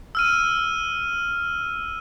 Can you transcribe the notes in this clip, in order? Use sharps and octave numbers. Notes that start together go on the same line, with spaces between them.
E6 F6 D#7